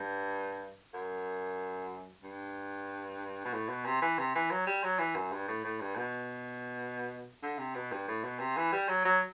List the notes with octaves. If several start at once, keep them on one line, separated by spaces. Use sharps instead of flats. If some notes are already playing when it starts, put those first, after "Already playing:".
Already playing: G2
F#2
G2
B2
A2
B2
C3
E3
C3
E3
F#3
G3
F#3
E3
F#2
G2
A2
A2
G2
B2
D3
C3
B2
G2
A2
B2
C3
E3
G3
F#3
F#3